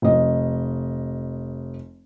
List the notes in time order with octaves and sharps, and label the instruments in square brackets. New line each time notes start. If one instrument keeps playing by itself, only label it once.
[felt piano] F1 D#5